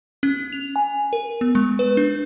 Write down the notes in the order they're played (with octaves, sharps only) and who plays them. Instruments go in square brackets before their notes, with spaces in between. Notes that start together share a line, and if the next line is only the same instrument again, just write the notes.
[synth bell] C#4
F7
G#5
A#4
B3
G#3
B4
D4